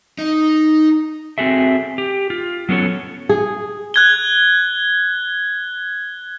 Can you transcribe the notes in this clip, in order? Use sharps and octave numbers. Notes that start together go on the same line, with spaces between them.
D#4
C4 F#4 G#4 A4 E5
G4
F4
F#3 B3 C#4 A4 C#5
G#4
F#6 G#6 G7